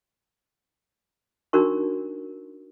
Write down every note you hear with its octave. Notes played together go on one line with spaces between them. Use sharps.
D4 D#4 F#4 A#4 C#6